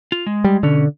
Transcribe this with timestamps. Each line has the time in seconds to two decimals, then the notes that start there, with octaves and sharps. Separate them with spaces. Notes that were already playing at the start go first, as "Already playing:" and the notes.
0.12 F4
0.26 G#3
0.44 G3
0.63 B2 D3 C#4